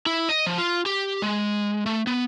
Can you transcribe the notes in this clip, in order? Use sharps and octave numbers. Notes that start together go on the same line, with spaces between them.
E4
D#5
F3
F4
G4
G#3
A3
B3